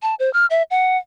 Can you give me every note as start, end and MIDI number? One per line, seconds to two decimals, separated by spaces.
0.02 0.15 81
0.19 0.32 72
0.33 0.46 89
0.50 0.63 76
0.71 0.97 78